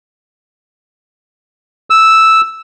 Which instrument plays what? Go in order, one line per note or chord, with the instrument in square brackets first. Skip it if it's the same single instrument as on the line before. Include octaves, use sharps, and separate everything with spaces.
[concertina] E6